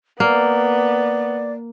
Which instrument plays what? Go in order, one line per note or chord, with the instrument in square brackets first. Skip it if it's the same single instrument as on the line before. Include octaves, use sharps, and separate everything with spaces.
[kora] A#3 [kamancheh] B3 [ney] D5